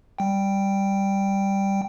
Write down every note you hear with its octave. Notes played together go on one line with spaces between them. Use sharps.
G3 G5